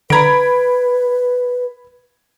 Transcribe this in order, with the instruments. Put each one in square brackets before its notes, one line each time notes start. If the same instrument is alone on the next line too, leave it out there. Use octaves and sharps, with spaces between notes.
[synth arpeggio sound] D3 A#5 [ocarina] B4 [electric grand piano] B5 G#6 D7